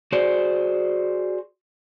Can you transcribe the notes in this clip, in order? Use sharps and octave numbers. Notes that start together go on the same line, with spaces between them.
F#4 G#4 C5 D5